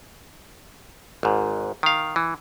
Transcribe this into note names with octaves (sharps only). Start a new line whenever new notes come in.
G#1 G#2
D#3 F5
E3